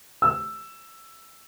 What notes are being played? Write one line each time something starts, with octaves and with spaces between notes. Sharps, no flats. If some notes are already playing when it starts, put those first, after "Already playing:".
E6